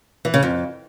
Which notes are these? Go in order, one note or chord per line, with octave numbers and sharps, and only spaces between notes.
E3
C#3
F2